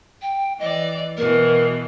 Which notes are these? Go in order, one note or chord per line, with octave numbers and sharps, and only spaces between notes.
G5
E3 D5 D#5
B2 E3 A#4